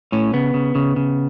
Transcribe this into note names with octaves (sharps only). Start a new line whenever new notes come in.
A2 C#4
C#3 B3
C#3
C#3
C#3